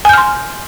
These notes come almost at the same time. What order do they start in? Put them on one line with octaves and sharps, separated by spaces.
G#5 G6 F6 C6